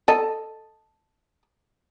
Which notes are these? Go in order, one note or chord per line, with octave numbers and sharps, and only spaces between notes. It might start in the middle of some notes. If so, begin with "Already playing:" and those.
A4 D#5